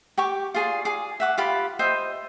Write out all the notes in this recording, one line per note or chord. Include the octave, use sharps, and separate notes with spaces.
G4 G5 C#6 D6
F4 G#4 D5
G#4 D6
E5 F#5 D6
F4 G4 B5
C5 D#5 E5 G5